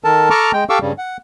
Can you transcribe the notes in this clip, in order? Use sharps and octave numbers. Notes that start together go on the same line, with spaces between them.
D#3 A4 A#4 A5
A4 A5 A#5 C#6 D6 F6
G#3 G5
G4 A4 F5 C#6 D6 E6
G2 C#3 G3
F#5